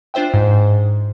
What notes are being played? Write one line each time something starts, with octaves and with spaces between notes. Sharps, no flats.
D4 F4 C5 E5 G5
G#2